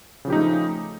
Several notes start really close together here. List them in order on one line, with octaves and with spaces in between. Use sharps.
C#3 F3 G4 D#4 A3